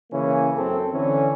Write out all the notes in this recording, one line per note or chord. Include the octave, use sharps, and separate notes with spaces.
C#3 E3 A#3 C#4
F#2 C4 A4
D3 E3 C#4